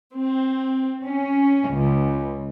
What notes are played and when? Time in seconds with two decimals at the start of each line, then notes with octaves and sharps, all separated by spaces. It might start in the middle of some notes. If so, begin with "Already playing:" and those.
0.15 C4
1.03 C#4
1.69 C#2